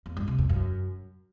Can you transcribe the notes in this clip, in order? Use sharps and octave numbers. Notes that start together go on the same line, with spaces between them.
E2
G2
C3
E2
F#2